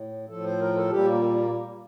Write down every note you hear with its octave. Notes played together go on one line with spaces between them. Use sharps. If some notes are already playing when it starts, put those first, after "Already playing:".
Already playing: A2
A2 F3 A4
C5
A#4
A4
A#2 G3 G4
A#3
A#3